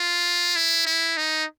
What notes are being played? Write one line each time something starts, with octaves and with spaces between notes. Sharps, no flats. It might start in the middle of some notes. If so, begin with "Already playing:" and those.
Already playing: F4
E4
E4
D#4